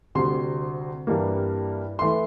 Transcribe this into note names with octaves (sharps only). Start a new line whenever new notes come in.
D2 C3 G3 C6
G2 E3 G3 A#3
E3 A3 E4 C6